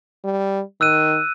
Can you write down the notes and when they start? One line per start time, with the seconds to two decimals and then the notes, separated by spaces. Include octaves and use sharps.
0.24 G3
0.81 D#3 E6 F#6 D#7